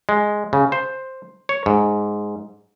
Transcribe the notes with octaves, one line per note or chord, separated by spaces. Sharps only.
G#3
C#3
C5
C#5
G#2